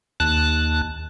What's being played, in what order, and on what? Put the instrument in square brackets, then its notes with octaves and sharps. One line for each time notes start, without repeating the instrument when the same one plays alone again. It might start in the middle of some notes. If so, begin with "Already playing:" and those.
[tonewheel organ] D#2 A5 F#6